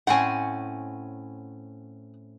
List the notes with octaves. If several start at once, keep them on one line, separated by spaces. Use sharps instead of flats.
A2 C4 C#4 F#5 G#5